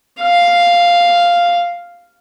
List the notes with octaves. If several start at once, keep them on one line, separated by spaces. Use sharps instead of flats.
F5